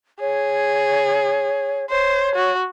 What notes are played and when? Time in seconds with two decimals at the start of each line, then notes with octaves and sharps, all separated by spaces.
0.21 G#4 C#5
1.90 C5 C#5
2.36 F#4